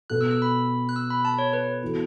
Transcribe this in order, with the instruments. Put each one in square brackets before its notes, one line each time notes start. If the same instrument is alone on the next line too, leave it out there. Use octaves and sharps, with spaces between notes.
[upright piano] B2 B3 A4 [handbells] F#6
[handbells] E6
E6
B5
F#6
E6
B5
A5
C#5
B4
[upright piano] E3 B3 F#4 A4